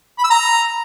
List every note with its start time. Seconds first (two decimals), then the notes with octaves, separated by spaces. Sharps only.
0.18 B5
0.24 E6
0.30 A#5